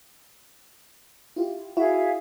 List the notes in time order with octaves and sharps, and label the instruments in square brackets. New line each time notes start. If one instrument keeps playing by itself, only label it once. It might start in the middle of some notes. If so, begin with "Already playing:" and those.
[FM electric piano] E4 F4 G4
[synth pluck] E4 [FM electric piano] F#4 [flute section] G#4 E5 F5